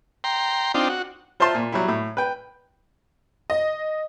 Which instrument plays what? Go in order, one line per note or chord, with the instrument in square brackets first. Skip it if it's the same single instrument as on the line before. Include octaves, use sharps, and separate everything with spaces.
[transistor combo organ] G5 A#5 C6
C4 D4 D#4 F4 G5
F#4
[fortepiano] F4 C5 E5 A5 C6
A#2
F#3 G3 E4
A2
B4 G5
[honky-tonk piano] D#5